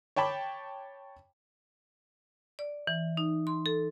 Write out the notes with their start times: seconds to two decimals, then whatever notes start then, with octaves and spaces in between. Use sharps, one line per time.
0.16 C#5 G5 A5 B5 D6
2.59 D5
2.87 E3
3.17 D#4
3.47 C6
3.66 A4